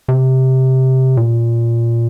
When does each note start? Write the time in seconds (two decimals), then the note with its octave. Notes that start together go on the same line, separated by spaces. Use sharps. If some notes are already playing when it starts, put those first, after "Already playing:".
0.08 C3
1.17 A#2